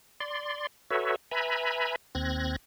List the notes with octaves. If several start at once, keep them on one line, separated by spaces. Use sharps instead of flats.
D5 C6
F#4 A4 B4 C#5 E5
B4 E5 G#5 A#5 B5
D#2 C4 F#6 G#6 A#6